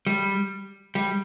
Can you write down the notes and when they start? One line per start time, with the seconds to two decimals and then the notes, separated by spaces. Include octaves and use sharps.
0.06 G3
0.95 G3